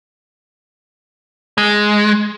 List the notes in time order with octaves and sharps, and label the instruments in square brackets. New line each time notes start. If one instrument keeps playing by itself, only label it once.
[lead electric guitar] G#3